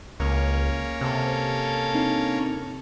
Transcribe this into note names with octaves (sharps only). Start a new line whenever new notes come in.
C#2 A#3 C#4
C3 A4
C4 D4 D#4